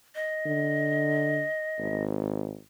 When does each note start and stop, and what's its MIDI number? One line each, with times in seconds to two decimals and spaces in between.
0.15 2.03 75
0.46 1.44 50
1.79 2.58 32